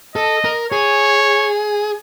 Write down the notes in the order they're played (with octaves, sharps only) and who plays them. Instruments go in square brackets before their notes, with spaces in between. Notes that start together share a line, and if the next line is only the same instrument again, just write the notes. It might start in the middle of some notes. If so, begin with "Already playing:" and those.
[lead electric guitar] A4 [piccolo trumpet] D#5
[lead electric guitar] A#4
[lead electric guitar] G#4 [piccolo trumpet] C#5